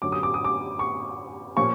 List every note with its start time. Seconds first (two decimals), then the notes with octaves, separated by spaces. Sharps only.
0.02 F#2 D3 F#3 D6
0.12 D#6
0.23 D6
0.34 D#6
0.44 D6
0.79 C#6
1.57 A#2 F3 A#3 C#4 C#6